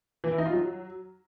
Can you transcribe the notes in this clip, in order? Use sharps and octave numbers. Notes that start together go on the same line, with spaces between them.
E3
E4
D#4
F4
F#3